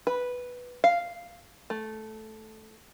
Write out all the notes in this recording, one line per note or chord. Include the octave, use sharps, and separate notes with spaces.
B4
F5
A3